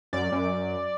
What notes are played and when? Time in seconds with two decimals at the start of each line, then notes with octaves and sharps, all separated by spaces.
0.13 F#2 D5
0.32 F#2